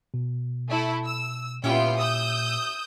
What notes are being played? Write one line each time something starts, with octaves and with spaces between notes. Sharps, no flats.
B2
A3 E4 A4
E6
A#2 B3 C#4 E4 F4 G4 G5
D#6 E6 G6